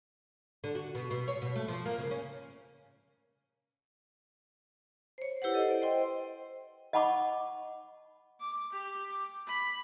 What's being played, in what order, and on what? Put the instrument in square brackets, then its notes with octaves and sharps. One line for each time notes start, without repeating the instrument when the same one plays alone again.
[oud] D3
F#4
B2
B2
C#5
B2
A3
F3
A#3
C#3
C#4
[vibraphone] C5 C#5
E4 G4 B4 C5 F#5
A4 D#5
C5 D5
C5 D#5 G5 C6
[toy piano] D#5 F#5 A5 B5 C#6 D6
[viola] D6
G4
D6
B5